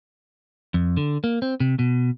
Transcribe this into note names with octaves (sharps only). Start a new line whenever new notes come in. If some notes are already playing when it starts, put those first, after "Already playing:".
F2
D3
A#3
C4
C3
B2